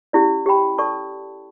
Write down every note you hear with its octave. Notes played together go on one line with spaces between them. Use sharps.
C#4 E4 G4 D5
G4 C#5 G5 B5
A4 D5 A5 C#6